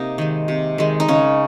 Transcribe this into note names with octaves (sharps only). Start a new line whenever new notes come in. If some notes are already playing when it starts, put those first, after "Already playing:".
Already playing: C3 A#3 D#4
D#3 G#3
C3
D#3 G#3
D#4
C#3 C#4